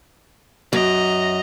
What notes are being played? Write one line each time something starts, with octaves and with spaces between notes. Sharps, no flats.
F#2 D#5 A#5